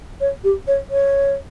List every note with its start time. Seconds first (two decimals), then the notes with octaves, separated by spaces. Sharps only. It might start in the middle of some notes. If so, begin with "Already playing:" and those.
0.21 C#5
0.44 G4
0.67 C#5
0.90 C#5